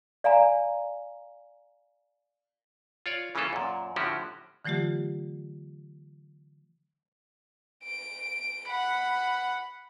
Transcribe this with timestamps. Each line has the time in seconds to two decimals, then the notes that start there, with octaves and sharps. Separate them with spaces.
0.24 D5 F5 G#5 A#5
3.06 F4 C#5 D5
3.35 C#3 E3 A#3 C#4 F4 A4
3.53 F#2 A#2
3.96 A2 D3 F3 C#4 F#4 G4
4.65 D3 E3 F#3 A3 F4 G4
7.84 D7
8.68 F#5 B5